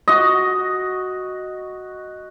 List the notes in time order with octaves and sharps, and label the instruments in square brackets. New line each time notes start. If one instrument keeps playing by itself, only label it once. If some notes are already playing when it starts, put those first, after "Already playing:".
[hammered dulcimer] F#4 D#5